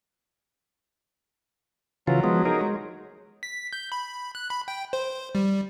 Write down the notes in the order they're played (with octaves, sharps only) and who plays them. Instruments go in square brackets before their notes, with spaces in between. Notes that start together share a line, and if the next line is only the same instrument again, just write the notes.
[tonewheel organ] C#3 E3 F4 [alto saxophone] F#3
[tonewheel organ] F3 G#3 B3
D#4 G#4 A#4
G#3
[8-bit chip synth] B6
G6
B5
F#6
B5
G5
C5
G3